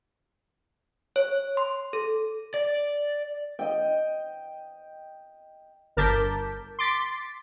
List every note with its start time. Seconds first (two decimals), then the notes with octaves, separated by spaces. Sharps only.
1.16 C#5
1.57 C6
1.93 A4
2.54 D5
3.59 D#5 G5
5.97 G1 A#4 A5 D6 G6 B6
6.79 C6 D6 A6 B6